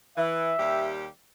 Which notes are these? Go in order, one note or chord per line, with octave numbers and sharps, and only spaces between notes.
E3 E5
D#2 G3 G4